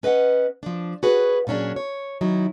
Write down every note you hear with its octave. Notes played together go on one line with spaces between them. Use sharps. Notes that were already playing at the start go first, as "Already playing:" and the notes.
C#4 B4 D#5 F5 F#5
F3 D4
F#4 G#4 B4 C#5
A#2 F#3 C#4 D4 G#4
C#5
D#3 F#3 D#4 E4